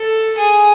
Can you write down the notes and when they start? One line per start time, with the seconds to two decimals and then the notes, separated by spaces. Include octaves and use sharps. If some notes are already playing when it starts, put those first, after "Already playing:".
Already playing: A4
0.38 G#4